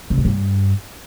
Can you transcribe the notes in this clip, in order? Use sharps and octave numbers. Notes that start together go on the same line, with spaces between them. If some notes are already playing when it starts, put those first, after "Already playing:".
C#3
A2
G2